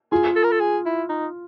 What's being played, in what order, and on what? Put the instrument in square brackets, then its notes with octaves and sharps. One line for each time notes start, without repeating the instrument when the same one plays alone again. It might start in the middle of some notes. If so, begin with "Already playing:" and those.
[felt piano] F4 [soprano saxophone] G#4
[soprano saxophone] A4
A#4
A4
G#4
E4
D#4